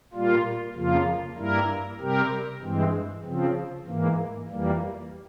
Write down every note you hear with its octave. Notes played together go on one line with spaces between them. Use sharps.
A#2 G3 A#3 F4
F2 C#3 F3 A#3 F4
G2 G3 A#3 E4 A#4
C3 G3 C4 G4 A#4
G2 E3 G#3 C4
C#3 F3 C4
G#2 E3 A#3
F2 E3 G3 A#3